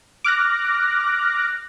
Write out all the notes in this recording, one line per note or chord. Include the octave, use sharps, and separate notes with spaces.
D6 F6 F#6 A#6